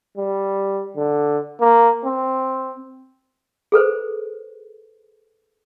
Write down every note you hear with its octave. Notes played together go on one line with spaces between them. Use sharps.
G3
D3
A#3
C4
G#4 A4 B4 C5